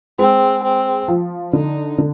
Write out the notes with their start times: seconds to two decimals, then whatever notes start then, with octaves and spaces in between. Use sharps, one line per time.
0.18 G#3 C4
0.64 C4
1.08 F3
1.53 D3 D#4
1.98 D3